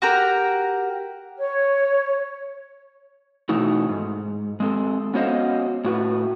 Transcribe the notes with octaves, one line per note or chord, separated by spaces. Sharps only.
F#4 G4 A#4
C#5
B2 E3 A3 D#4 F#4
G#2
G#3 C4 A4
B3 C#4 F#4 C5 D#5 F5
A2 F#4 B4